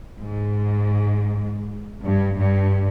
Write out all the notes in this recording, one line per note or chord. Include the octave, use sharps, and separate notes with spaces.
G#2
G2
G2